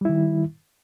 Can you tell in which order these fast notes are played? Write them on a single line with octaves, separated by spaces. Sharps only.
G3 E4 D#3